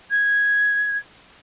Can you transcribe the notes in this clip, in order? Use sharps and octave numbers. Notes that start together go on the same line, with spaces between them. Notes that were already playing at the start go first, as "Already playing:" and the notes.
G#6